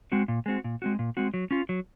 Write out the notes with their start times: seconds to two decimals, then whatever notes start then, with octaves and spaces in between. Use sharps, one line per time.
0.12 G#3 C4 F#4
0.28 A#2
0.46 G#3 C4 F#4
0.64 A#2
0.82 G#3 C4 F#4
0.99 A#2
1.17 G#3 C4 F#4
1.34 F#3
1.51 C#4 F4
1.69 F#3